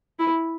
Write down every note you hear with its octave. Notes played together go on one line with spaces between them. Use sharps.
E4